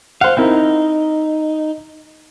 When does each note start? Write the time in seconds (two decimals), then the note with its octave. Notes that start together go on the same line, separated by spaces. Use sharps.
0.21 C5 F5 F#5
0.37 C4 D#4 E4 A#4